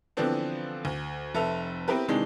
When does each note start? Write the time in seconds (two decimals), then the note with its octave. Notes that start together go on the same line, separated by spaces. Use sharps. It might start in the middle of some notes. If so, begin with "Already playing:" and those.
0.17 D3 E3 F3 B3 C4 D4
0.85 D2
1.35 F1 A4 B4 E5 F7
1.88 B3 C4 E4 G4 A#4 B4
2.08 C3 D#3 E3 G#3 D4